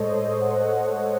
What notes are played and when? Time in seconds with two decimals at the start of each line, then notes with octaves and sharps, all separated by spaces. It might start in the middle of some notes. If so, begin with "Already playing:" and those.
Already playing: A2 G#3 A4 C5 C#5 D#5
0.11 A2 C5 D#5
0.41 D#5 F#5